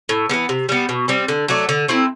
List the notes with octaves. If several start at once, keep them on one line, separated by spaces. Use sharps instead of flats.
A2
E3 G3 B3
C3
G3 B3
B2
G3 C4
D3
F#3 A3 D4
D3
A3 C4 E4